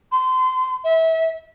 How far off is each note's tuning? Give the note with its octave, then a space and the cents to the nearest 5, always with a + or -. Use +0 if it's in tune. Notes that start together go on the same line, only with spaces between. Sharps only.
C6 -30
E5 -25